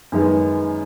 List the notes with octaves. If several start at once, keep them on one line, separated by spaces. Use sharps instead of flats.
F#2 D#3 G#3 B3